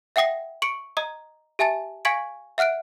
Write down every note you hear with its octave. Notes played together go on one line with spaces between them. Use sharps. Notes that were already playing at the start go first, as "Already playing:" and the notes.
E5 F#5 G5 D#6 A#6 C7
C#6 C#7 D7
D#5 A#5 D#6
G4 E5 G#5 A5 A6
F5 G#5 C#6 G#6 B6 D7
E5 F#5 F6 F#6 D7